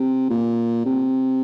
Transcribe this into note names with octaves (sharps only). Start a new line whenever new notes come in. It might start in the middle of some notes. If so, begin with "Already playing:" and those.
Already playing: C3
A#2
C3